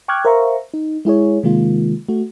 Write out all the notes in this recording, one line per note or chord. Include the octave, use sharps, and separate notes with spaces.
G5 C#6 D6 F6 F#6 G#6
A#4 C5 E5 F5 A#5 C#6
D#4
G#3 E4 G#4 C#5
C3 D#3 G#3 A#3 F4
A3 F#4